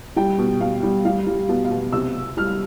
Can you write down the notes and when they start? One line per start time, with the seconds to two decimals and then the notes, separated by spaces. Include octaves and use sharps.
0.16 G3 G5
0.39 B2
0.61 B2 F5
0.83 G3
1.05 G3 F5
1.27 G3
1.49 B2
1.64 F5
1.71 B2
1.93 C3 E6
2.15 C3
2.37 G3 F6